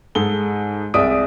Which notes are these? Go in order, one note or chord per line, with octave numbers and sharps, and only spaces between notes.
G#2 G#4 A4 G7
C2 G#3 D5 E5 D#6 D7